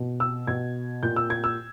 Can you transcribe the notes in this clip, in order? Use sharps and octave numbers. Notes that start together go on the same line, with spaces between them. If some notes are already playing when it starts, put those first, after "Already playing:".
Already playing: B2
E6
B2 G#6
A#2 G6
E6
G#6
E6